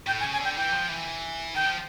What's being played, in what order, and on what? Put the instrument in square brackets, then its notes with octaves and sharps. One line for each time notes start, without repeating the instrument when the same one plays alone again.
[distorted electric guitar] A2 [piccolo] G5
[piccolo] G#5
[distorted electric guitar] C#3
[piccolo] G#5
[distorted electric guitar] D3 [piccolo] G5
[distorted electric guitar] E3 [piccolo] G5
[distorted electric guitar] F3
E3
[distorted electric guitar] D#3 [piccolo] G5
[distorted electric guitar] F3